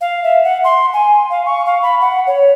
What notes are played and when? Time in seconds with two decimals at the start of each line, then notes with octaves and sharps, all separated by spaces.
0.01 F5
0.24 E5
0.44 F#5
0.64 C6
0.93 G#5
1.30 F5
1.46 C#6
1.66 F5
1.83 B5
2.01 F#5
2.27 C#5